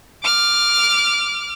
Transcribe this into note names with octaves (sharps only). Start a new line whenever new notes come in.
D6 F6